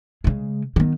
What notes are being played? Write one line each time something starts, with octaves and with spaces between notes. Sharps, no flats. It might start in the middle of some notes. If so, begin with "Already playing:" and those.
C#3 G#3
D#3 B3